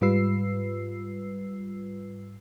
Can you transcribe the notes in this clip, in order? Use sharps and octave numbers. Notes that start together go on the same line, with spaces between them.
G#2 G3 F4 B4 E6 C7